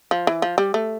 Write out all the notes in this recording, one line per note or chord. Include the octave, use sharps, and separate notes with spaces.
F3
E3
F3
G3
A3